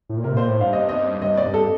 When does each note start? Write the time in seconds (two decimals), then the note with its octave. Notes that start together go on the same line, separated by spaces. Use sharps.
0.09 A2
0.17 A#2
0.24 C3 A#4
0.33 A2
0.36 A#2 C5
0.48 A2
0.61 G2 F5
0.73 D#5
0.89 D#5
1.21 G2 D#5
1.37 D5
1.46 G2
1.54 A4